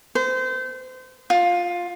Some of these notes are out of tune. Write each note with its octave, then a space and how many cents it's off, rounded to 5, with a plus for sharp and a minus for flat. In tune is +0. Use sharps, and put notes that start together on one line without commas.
C5 -30
F4 +10